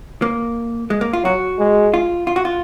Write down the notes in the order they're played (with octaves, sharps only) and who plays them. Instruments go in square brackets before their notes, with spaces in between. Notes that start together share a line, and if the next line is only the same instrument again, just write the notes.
[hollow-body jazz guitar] A#3
G#3
A#3
F4
[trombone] F#3 [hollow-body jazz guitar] F#4
[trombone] G#3
[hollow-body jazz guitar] F4
F4
F#4
F4